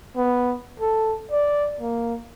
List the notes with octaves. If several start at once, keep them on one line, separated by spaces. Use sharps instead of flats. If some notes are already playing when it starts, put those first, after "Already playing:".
B3
A4
D5
A#3